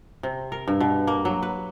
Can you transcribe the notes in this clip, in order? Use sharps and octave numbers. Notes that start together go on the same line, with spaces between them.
C3
A#4
G2
B2
A#3
F#3
B4